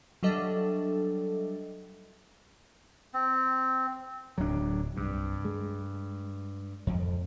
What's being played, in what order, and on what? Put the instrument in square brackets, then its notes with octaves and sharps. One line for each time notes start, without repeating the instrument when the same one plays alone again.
[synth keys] F#3 G3 D4 A4 D#5 E5
[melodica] C4
[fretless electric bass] D1 [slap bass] F#3 D4
[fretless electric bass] C2 [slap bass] G2
[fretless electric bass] G#3
[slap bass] F2